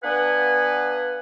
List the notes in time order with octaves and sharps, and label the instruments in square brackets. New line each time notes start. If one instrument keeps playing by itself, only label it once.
[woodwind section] B3 D4 B4 F5 F#5 G#5